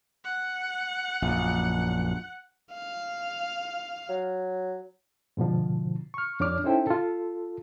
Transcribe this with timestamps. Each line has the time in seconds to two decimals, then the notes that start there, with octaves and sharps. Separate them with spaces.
0.24 F#5
1.22 A#1 F#2
2.73 F5
4.09 F#3
5.37 G#2 B2 D3 F3
6.14 C#6 F6
6.40 F2 D4 C#5 D6 F6
6.64 C#4 D#4 E4 A4 C5 G5
6.87 F4 A4